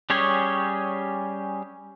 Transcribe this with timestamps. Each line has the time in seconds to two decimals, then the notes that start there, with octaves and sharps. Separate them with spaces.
0.10 G3 C#4 G4 G#4 C#5